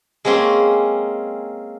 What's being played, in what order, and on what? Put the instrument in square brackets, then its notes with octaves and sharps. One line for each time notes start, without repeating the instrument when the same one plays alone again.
[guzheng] G#3 A#3 C4 C#4 C6